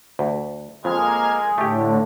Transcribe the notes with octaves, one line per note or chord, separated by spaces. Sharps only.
D2
F2 G#3 A#3 F6 G#6
A2 D3 A3 G4